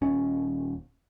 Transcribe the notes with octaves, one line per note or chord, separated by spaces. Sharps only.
D#1 C#4